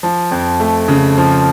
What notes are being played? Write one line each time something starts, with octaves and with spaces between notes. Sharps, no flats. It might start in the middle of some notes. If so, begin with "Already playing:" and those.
F3
F2
A3
C#3
F3